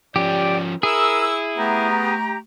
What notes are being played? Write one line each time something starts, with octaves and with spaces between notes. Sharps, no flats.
F3 C#4 G4 D5
E4 G#4 A#4 E6
A3 B3 G4 A#5